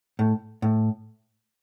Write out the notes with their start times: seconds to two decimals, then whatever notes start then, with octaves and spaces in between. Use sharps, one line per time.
0.19 A2
0.62 A2